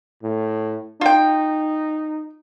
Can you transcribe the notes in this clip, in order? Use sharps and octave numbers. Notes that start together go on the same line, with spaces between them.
A2
D#4 F4 G5